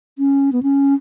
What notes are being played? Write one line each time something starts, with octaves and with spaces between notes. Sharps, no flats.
C#4
B3
C#4